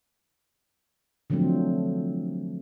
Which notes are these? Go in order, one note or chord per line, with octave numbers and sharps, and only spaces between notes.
D3 F3 F#3 A3 C4